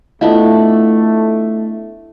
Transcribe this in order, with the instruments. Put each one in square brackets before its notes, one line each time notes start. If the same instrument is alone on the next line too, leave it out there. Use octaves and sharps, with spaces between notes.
[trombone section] A3 [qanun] B3 D4 E4 [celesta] F4 D#5 F5